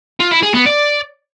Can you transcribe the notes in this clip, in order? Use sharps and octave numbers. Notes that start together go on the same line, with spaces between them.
F4
E4
G#4
B3
D5